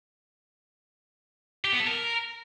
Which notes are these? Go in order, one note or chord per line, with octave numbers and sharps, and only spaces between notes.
G4
B3
A4
A#4